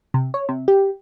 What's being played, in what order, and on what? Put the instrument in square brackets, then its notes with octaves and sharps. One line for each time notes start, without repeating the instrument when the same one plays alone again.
[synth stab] C3
C#5
C3
G4